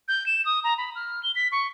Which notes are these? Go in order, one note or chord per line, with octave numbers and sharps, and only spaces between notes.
G6
E7
D#6
A#5
B5
F6
G7
B6
C#6